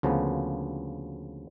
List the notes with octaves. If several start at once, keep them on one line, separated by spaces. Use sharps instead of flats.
D2 C#3 F3 A#3 B3